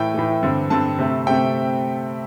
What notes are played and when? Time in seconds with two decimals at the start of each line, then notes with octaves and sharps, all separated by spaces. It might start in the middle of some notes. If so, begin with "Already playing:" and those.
Already playing: A2 E3 A3 G5
0.14 A2 E3 A3
0.43 G2 D3 C4
0.70 G2 D3 C4 A5
0.99 C3 A3 C4
1.27 C3 A3 C4 G5